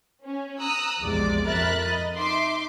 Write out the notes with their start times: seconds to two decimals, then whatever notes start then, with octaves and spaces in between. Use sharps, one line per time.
0.25 C#4
0.60 A#5 D#6 E6 F#6
1.01 A#1 E2 C3 G#3 D5 D6
1.47 F2 A#4 E5 B5 F#6 A6
1.86 D#5
2.16 D#4 E5 C6 D6